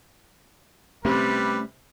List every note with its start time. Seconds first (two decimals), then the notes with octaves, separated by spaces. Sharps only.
1.05 C3 G3 A3 C#4 B4